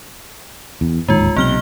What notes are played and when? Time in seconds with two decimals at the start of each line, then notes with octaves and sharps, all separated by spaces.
0.81 E2
1.08 D1 D#2 G#2 G#3 F4
1.36 B1 C3 A#3 F6 G7